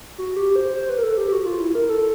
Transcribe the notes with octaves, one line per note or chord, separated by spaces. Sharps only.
F#4
G4
C5
C5
B4
A#4
A4
G4
G4
F#4
F4
E4
A#4
A4